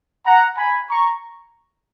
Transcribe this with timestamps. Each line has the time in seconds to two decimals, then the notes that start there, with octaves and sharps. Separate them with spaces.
0.25 F#5 A#5
0.57 G#5 B5
0.89 A#5 C#6